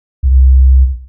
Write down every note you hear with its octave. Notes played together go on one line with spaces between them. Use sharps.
C2